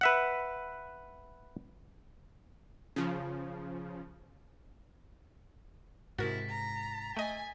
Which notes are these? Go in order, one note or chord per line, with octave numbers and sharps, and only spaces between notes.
B4 E5 F#5
C#3 F3
G#2 C3 E4 F#4 A#4 A6 B6
A#5
A3 D#5 G#5 A6